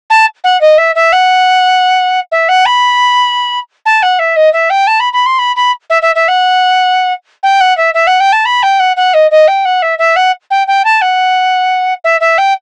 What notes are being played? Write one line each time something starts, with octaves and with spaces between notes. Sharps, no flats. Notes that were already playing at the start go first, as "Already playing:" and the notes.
A5
F#5
D#5
E5
E5
F#5
E5
F#5
B5
A5
F#5
E5
D#5
E5
G5
A5
B5
B5
C6
B5
B5
E5
E5
E5
F#5
G5
F#5
E5
E5
F#5
G5
A5
B5
G5
F#5
F#5
D#5
D#5
G5
F#5
E5
E5
F#5
G5
G5
A5
F#5
E5
E5
G5